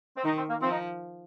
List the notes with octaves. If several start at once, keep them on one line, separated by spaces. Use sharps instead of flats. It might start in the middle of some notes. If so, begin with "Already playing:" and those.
C4
D#3 D#4
C4
A#3
F3 C4
D#4